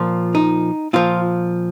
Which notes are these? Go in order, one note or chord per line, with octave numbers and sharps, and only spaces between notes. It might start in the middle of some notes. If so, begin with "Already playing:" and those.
Already playing: A#2 F3
D#4
A#2 F3 F4